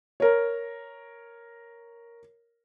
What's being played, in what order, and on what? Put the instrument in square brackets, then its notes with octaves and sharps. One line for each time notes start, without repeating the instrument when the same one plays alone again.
[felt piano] A#4 C#5